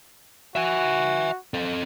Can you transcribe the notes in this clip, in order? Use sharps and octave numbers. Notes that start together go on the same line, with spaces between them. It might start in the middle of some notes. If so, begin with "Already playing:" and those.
F#4 E5 G#5
C4 A4